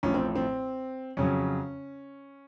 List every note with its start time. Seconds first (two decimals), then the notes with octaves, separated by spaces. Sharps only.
0.03 A1 A2 F3 C#4
0.14 C4
0.35 C4
1.17 F2 C#3 F#3 C#4